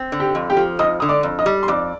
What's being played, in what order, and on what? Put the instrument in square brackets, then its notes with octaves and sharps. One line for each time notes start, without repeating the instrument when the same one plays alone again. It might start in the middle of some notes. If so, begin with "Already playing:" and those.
Already playing: [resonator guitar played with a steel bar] C4
D3
[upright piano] G4 G5
[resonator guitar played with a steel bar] F2
[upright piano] G4 G5
[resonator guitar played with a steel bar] F3
[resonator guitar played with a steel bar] F2 [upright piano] D#5 D#6
[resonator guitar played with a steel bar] D3 [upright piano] D#6
[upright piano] D5 D6
[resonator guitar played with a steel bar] F2
[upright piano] D#5 D#6
[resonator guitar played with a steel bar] G3
[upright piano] C6
[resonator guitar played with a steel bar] F2 [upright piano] D5 D6